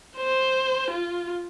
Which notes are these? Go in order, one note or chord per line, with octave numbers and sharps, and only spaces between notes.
C5
F4